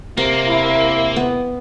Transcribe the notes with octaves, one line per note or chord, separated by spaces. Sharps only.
C3 A#3
E4
B3